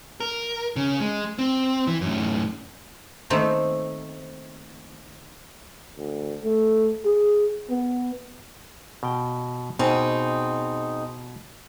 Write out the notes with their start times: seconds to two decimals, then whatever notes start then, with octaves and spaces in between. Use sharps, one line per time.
0.20 A#4
0.76 C#3
1.00 G#3
1.39 C4
1.87 E3
2.01 F#2 A2
3.30 D#3 A3 A#3 C4 C5
5.98 D2
6.44 A3
7.05 G#4
7.70 B3
9.03 B2 G5
9.79 B2 C4 D#4 G#4